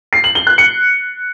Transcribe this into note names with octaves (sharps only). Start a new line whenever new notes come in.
C7
F#7
G7
F#6
C#7